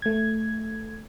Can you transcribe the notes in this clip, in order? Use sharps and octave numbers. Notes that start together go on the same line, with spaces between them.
A3 G#6